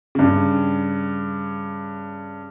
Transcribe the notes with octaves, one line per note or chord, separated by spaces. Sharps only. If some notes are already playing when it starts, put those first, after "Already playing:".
G2 C#3